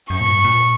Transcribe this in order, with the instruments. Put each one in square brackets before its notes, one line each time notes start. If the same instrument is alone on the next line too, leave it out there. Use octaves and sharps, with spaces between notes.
[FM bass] F#2 [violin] C#6
[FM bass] A#2
G2
A#2